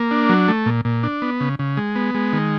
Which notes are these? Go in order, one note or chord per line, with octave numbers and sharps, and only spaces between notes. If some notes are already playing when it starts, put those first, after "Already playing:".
Already playing: A#3
D4
F#3
A3
A#2
A#2
D4
B3
C#3
C#3
G#3
B3
G#3
D#3